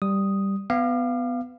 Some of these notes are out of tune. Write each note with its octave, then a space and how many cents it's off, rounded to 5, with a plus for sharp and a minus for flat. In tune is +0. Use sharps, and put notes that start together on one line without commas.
G3 +0 D#6 +0
B3 +15 F5 -15 D6 +40